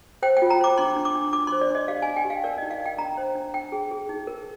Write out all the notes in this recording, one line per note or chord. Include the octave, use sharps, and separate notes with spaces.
C5 G5
G5
F4
A#5
C5 D6
D4 C6
D4
D6
D4
D4 D6
C6
C5
D5
D4 D#5
G4 F5
G#5
D4
G5
G4
F5
A#4 D5
D#4 D#5
F5
D#4 G5
D4 A#5
C5
D4
D4 G5
G#4
G#4
D#4
A#4